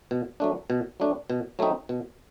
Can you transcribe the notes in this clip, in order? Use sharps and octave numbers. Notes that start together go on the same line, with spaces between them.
B2
F#3 A3 D4
B2
F#3 A3 D4
B2
F#3 A3 C4 D#4
B2